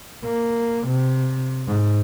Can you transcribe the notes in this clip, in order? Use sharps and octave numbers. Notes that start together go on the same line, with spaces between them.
A#3
C3
G#2